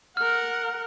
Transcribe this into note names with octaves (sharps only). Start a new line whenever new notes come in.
A#4 F#5 F6